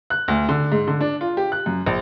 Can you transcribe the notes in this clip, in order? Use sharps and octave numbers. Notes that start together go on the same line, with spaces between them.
F#6
D2
D3
G#2
D3
D4
F4
G4
F#6
F#2
A#1